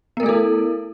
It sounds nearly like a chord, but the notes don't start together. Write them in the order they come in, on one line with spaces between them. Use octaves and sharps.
B3 A#4 A3 A4 E4